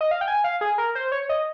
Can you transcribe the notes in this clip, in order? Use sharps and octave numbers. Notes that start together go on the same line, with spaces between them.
D#5
F5
G5
G#5
F5
G#4
A#4
C5
C#5
D#5